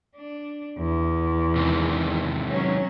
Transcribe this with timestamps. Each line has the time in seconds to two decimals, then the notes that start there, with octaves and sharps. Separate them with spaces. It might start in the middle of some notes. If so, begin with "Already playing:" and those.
0.16 D4
0.78 E2
1.56 C3 D#3 G#3
2.49 F#3 C#4